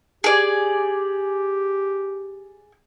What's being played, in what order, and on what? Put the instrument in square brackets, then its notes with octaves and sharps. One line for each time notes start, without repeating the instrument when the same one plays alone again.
[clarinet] G4 [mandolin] G#4 D5